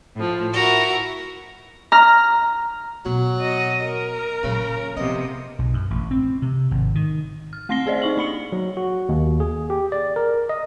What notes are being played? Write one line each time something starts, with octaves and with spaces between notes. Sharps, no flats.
A2 F3
E4 F#4 A#4 A#5
A#5 F6
B2 F#3
F#4 D#5
A#4
A#2 C#3 F#3
C3 F3 B3 D#5
B1
F#2
A1
C4
C3
G#1
D#3
F6
A3 C4 C6 A#6 C7 G7
C4 G#4 C5 D5 D#5
D#4 C#6 F#7
A#3 B5 C#7
F#3
F#4
D#2
G#4
G4
D5
A#4
D#5